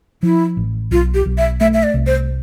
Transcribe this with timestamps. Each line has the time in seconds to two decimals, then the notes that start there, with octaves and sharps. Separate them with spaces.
0.23 F3 E4
0.57 A1
0.91 B1 F4
1.14 G4
1.26 B1
1.38 E5
1.60 A3 E5
1.74 E5
1.83 D5
1.94 C2
2.06 C5